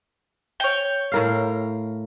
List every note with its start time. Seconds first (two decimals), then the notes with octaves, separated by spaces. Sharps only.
0.60 C#5 G5
1.12 A2 A#4 F5